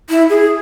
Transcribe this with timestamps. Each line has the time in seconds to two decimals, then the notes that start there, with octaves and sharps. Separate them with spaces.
0.09 E4
0.29 G#4